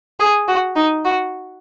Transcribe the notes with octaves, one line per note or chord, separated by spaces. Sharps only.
G#4
F#4
D#4
F#4